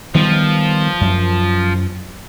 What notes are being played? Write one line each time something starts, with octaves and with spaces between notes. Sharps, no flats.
D#3 F3 G3 B3
F#2